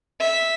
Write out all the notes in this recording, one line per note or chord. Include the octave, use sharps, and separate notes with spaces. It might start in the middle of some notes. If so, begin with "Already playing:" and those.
E5